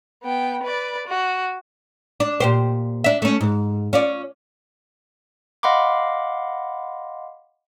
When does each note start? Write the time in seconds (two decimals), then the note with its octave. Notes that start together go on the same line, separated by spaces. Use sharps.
0.23 B3 G5
0.63 B4 D5
1.08 F#4
2.20 D4
2.40 A#2 G4 C5
3.04 D4 E5
3.22 A3 C#4
3.41 G#2
3.93 C#4 F4 D5
5.63 D#5 F5 F#5 B5 C6 D6